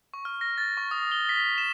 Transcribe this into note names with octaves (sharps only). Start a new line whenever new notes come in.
C#6
F6
A#6
A6
C#6
D#6
G7
B6
E7